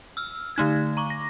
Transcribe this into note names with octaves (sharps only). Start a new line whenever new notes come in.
E6 F6
D3 A3 D#4 G#6
A#5 C#6 D6
A#6